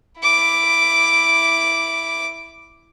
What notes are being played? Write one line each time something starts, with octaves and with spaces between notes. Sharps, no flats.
E4 D6